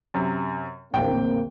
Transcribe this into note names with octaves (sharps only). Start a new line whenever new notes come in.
F#2 C3
D1 A#1 E2 A#3 C4 G5